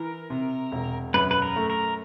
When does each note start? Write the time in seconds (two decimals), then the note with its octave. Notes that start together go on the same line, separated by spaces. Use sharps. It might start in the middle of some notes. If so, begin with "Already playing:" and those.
Already playing: E3 A#4
0.30 C3
0.72 E1
1.14 F#2 B4
1.31 B4
1.42 A#4
1.56 A3
1.70 A#4